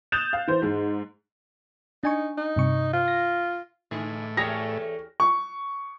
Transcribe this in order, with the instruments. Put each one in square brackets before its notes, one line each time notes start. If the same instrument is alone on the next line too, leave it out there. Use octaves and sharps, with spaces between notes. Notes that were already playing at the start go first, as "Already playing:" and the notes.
[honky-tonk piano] D#6 F#6 G6 A6 E7 F7
F5
E3 C5
G#2 G#3
[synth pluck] D4 G#5 C#6 [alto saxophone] D#4
[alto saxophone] D#4
[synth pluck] G2 C3 C#6
[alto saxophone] F4
[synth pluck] A#6
[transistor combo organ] A2 [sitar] D3 [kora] E3 G#3
[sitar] E2 A3 C#5 [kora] G4 G#4 A#4 [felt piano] A#6
[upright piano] C#6